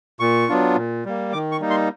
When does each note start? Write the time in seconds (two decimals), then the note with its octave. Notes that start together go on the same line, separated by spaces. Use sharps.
0.20 A#2 C#6
0.48 F#3 B3 D4 F4
0.76 A#2
1.05 G3 A#3
1.33 D#3 D6
1.52 C#6
1.61 G3 A#3 D#4
1.70 C6